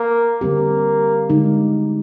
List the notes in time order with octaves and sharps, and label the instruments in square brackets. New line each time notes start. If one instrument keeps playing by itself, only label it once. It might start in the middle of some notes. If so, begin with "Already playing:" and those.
Already playing: [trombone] A#3
[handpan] D3 G3 C4 G4 [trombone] A#3
[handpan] D3 G#3 D#4